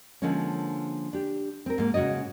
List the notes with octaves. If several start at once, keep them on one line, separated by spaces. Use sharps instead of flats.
D3 F3 G#3 A#3 C#4
D4 G4
C4 A#4
G#2 A#3
G#2 C#3 F#4 C#5 D#5